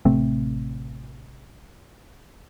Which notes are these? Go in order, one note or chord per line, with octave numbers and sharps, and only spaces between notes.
A1 C3 A3 C4